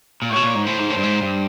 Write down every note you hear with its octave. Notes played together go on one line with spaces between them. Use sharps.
A#2
A2 C#5
B2
A#2
G#2
A2 C5
G#2
A2
G2
G#2
G2